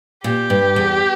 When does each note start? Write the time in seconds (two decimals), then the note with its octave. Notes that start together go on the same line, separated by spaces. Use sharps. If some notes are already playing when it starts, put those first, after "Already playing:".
0.24 A#2 G4
0.50 G2
0.76 E2